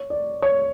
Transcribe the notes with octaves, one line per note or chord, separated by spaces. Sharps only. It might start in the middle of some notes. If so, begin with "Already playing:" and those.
Already playing: C#5
D5
C#5